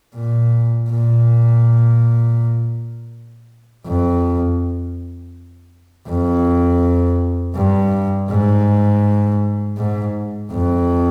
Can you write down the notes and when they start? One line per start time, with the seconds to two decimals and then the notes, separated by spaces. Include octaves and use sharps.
0.16 A#2
0.90 A#2
3.86 F2
6.08 F2
7.56 G2
8.30 G#2
9.78 G#2
10.52 F2